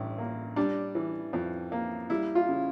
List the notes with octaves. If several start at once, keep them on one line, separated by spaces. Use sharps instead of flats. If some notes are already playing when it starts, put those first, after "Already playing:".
Already playing: A1 G2
A#3
G3 D4
E3
F2
A#3
G3 E4
F4
C#3